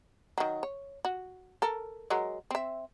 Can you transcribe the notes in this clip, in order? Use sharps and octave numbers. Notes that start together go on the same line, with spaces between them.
D#3 F#3
C#5
F#4
A4 A#4
F#3 G#3 A#4
C4 E5